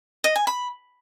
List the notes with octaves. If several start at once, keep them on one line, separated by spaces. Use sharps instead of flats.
D#5
G#5
B5